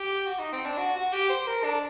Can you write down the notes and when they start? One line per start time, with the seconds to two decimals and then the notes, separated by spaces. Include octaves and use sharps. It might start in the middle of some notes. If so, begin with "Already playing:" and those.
Already playing: G4
0.27 F#4
0.39 D#4
0.53 C4
0.66 D4
0.78 F#4
0.96 F#4
1.13 G4
1.30 C5
1.47 A#4
1.64 D4